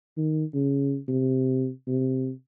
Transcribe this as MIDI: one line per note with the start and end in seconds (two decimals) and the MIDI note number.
0.17 0.44 51
0.54 0.98 49
1.08 1.70 48
1.87 2.31 48